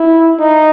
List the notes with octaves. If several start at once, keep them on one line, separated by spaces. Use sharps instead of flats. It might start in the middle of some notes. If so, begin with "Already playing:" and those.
Already playing: E4
D#4